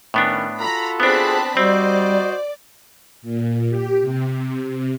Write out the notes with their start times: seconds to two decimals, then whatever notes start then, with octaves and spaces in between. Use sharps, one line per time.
0.14 A2 D#3 B3 C#4 D4
0.60 F4 F#4 A4 A#5 B5
1.00 B3 C4 D4 G#4 A5 B5
1.57 G3 C4 F#4 C5 D5 D#5
3.22 A#2
3.69 G4
4.01 C3
4.63 C3